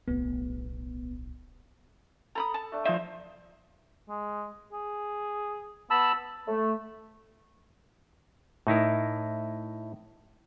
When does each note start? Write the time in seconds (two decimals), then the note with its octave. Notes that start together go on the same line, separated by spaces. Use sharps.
0.08 D1 B1 B3
2.35 A4 A#5 B5 D#6
2.54 A5
2.72 A3 D4
2.85 F3 D#4 F4 C5 E5
4.09 G#3
4.72 G#4
5.90 B3 A5 B5 E6
6.48 A3
8.67 A2 D#4 E4 A#4